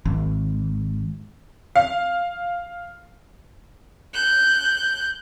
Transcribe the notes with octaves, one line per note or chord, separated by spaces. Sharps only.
G#1
F5
F#6 G6